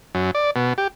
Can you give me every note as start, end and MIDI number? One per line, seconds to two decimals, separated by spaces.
0.15 0.31 42
0.35 0.51 74
0.56 0.73 47
0.78 0.88 67